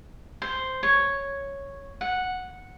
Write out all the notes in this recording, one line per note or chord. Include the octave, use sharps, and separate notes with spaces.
C5
C#5
F#5